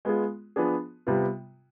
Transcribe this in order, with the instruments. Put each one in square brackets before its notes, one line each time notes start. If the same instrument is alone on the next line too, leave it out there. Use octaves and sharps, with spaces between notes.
[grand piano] G#3 B3 F4 G#4
F3 B3 D4 G#4
C3 G3 B3 F4